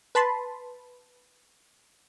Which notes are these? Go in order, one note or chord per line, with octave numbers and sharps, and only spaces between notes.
B4 A5 B5 C6